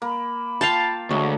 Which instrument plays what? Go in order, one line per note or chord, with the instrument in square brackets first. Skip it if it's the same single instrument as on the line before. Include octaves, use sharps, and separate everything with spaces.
[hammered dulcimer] A#3 [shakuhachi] B5
[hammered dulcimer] F4 [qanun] F5 G5 A5
[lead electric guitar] D2 [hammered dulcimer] G#3 C#5 F#5